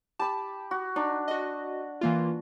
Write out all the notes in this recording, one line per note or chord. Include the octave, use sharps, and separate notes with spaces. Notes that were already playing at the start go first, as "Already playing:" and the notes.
G4 A5 B5
F#4
D4 D#4
F#4 D#5
E3 A#3 F4